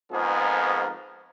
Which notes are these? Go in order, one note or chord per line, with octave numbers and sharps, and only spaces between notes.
F2 G#2 F3 B3 G#4 A#4